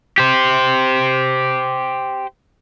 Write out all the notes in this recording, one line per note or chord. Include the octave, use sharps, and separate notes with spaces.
G4 C5